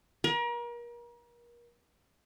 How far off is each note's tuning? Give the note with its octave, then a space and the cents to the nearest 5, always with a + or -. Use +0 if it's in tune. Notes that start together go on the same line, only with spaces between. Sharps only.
A#4 +35